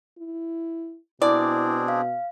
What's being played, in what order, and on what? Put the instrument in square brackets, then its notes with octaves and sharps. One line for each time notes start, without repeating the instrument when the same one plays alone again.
[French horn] E4
[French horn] B2 [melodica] C4 D4 G#4 [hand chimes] E4 [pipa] D5
[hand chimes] F5